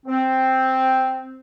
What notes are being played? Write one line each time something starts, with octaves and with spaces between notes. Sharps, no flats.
C4